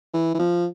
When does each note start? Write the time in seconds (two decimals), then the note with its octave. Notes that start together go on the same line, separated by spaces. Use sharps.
0.14 E3
0.34 E3
0.39 F3